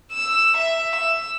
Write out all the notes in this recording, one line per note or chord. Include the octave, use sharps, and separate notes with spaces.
E6
E5
E6